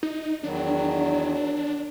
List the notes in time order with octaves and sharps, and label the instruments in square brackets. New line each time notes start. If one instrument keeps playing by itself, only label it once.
[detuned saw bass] D#4
[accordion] E2 D#3 F#3 [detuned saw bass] D4